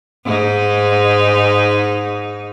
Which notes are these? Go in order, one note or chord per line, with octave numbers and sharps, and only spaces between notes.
G#2 D#4